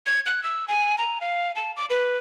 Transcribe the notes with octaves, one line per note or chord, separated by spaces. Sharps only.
G#6
F#6
E6
G#5
A#5
F5
A5
D6
B4